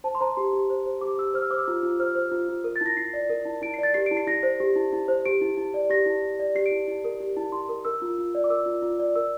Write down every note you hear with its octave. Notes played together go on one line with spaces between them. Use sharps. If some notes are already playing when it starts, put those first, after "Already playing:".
C5 A5
C6
C5 A#5
G4 C6
G4
C5
C5
G4 D6
G4 E6
C5 F6
E6
C5 D6
E6
F4
F4
C5 F6
C5
F4
F4
A#4
A6
E4 A#6
E4 C7
D5
A#4
E4
E4 D7
C7
D5 A6
G4 C7
D7
E4
C7
E4 A#6
C5
G4
E4
E4
C5
G4 D7
E4
E4
D5
G4 A#6
E4
E4
D5
G4 C7
D7
E4
E4
A#4
G4
E4
E4 C6
A#4
A#4 E6
F4
F4
D5
D6
A#4 E6
F4
F4
D5
A#4 E6